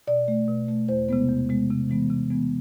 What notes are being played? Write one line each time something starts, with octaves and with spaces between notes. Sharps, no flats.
B2 D5
A3
B2
A3
E2 C5
C3 G#3 B3
E2
C3 G#3 B3
C3
E3 G#3 B3
C3
E3 G#3 B3